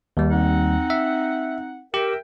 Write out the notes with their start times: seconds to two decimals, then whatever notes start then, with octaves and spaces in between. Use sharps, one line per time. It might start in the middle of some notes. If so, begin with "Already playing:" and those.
0.17 D#2 G3
0.31 C4 D#4 F#5
0.90 E5
1.94 G4 A#4 E5 G5